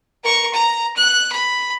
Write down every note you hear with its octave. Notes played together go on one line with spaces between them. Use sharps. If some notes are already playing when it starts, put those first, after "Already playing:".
A#4 C#6
A#5
F#6
B5